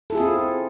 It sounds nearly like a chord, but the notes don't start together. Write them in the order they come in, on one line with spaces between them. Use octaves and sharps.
A4 E4 G#4 F4 C4